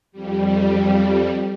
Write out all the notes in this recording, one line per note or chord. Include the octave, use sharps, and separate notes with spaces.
F2 G3